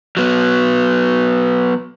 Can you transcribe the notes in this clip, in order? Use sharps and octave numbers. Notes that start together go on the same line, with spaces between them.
F#3 B3